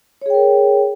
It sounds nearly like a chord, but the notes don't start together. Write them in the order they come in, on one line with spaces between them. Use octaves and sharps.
C#5 G#4 G5 A#4